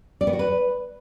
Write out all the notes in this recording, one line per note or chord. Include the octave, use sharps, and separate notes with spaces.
D5
B3
F#4
B4